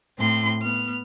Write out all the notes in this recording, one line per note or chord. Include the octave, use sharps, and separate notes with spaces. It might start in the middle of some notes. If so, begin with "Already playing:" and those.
A2 C4 C6
B3 F6